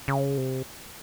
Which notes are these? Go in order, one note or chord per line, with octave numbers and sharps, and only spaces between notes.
C#3
C3